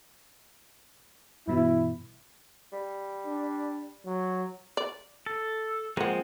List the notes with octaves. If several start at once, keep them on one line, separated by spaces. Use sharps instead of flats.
G2 B2 E3 E4
G3
D4
F#3
D5
A4
F3 G#3 A#3 C4 F#5